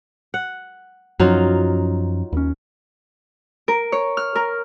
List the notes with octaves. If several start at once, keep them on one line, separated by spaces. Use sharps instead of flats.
F#5
F#2 F3 F#3 C#4 D#4 F4
D#2 C#4
A#4
C#5
F6
A#4